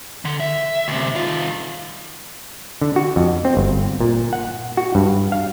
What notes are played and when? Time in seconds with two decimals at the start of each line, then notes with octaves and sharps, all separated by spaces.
0.25 D3
0.40 E5
0.88 D2 C3
1.16 D#3 F4
2.82 D3
2.96 F#4
3.16 F2
3.45 C4
3.57 G1
4.00 A#2
4.33 F#5
4.77 F#4
4.95 G2
5.32 F5